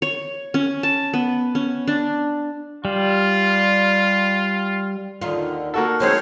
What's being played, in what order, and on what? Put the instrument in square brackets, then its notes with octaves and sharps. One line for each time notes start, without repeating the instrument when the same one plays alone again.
[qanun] C#5
C#4
A5
B3
C#4
D4
[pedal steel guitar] G3 [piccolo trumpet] F4
[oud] D#2 D#3 F4 [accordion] D3
[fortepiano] A#3 F#4 A4
[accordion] D#3 C4 C5 [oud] F3 G#3 D#4 [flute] C#5